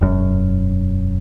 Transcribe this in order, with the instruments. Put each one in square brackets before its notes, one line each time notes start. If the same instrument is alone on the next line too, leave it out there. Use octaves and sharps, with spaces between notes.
[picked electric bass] E1 F#2